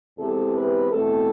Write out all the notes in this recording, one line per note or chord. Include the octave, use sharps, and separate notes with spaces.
E2 C3 G#3 A4
B4
E2 B2 A3 C4 A4